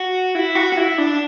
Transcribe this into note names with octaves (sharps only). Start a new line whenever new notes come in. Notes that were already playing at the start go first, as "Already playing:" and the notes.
Already playing: F#4
E4
F#4
F#4
E4
D4